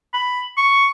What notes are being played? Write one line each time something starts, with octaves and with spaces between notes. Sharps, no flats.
B5
C#6